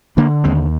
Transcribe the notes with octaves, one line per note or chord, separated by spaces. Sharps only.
D3 A#3 D4
D#2 G#3 C4